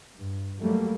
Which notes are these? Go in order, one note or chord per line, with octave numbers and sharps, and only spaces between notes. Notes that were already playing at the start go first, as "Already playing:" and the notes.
G2
F#3 G3 A3 A#3